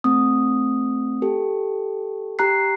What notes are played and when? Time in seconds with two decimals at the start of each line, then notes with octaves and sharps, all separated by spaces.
0.04 A3 C4 D#6
1.22 G4 A4
2.39 G4 A#5 F#6 C7